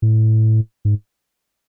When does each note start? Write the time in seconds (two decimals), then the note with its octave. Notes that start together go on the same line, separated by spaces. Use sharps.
0.02 A2
0.85 G#2